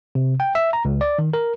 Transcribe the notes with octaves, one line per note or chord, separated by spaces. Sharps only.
C3
G5
E5
A#5
C#2
D5
D#3
A#4